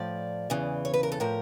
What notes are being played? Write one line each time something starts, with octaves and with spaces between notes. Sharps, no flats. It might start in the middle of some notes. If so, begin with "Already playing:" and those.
Already playing: A2 F3 D5
E2 C#3 E3
C#5
B4
A#4
A4
A2 F3 A#4